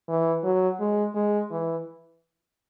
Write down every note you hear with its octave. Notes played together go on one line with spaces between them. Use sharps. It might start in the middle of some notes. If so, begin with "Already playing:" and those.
E3
F#3
G#3
G#3
E3